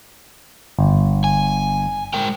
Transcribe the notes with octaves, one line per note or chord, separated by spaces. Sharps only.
G1
G#5
G#3 A#4 G5